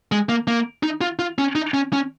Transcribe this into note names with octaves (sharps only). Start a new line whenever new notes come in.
G#3
A#3
A#3
D#4
F4
F4
C#4
D#4
C#4
C#4